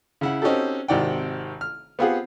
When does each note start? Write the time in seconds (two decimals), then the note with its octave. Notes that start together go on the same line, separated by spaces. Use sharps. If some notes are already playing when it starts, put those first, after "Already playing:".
0.21 C#3 E4 F#5
0.42 C4 C#4 D#4 F#4 G4 A4
0.88 G#1 C3 D#3 D5 F#5 G5
1.61 F6
1.99 B3 C4 F4 G4 G#4 F#5